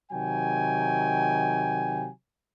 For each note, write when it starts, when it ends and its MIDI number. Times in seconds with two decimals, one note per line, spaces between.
0.12 2.08 48
0.12 2.08 51
0.12 2.08 54
0.12 2.08 79
0.12 2.08 80